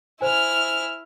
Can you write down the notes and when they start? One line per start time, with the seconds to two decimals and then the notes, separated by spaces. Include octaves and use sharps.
0.21 E4 C5 G#5 F6